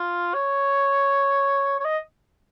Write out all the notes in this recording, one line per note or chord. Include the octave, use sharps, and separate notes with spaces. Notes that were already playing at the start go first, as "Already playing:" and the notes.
Already playing: F4
C#5
C#5
D#5